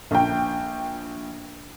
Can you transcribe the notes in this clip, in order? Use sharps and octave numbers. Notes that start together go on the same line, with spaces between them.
A#1 G5